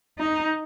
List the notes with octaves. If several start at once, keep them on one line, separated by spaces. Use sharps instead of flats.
D#4